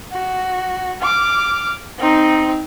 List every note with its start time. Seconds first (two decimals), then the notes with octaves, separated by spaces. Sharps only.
0.12 F#4
1.02 D6 F6
1.98 C4 D#4